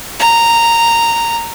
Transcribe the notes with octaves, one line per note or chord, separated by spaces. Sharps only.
A#5